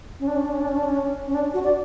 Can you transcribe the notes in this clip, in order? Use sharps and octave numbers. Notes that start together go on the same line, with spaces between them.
C#4
D4
C#4
D4
C#4
D4
C#4
D4
C#4
C#4
D4
F#4
D5